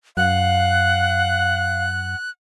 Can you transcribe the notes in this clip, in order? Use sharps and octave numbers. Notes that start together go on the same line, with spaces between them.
F#2 F5 F#5 F#6